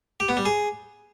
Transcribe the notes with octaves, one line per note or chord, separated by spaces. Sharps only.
G4
B3
G3
G#4